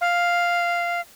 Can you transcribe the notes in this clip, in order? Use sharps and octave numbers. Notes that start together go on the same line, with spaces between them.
F5